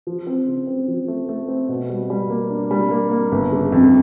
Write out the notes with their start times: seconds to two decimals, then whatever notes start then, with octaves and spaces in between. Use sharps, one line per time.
0.07 F3
0.27 C4
0.48 C#3
0.67 C4
0.88 F3
1.08 A3
1.29 A3
1.48 C4
1.69 B2
1.89 G3
2.10 G3
2.30 A#3
2.51 D4
2.71 G3
2.91 A#3
3.11 A#3
3.32 G1
3.52 C#3
3.72 F2